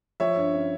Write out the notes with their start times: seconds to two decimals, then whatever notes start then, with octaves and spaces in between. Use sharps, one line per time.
0.20 F3 C#5 E5
0.36 G2
0.54 C#4